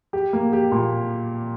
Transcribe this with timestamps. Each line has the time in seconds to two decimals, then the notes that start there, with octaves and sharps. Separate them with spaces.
0.13 G4
0.33 A#3
0.53 G4
0.72 A#2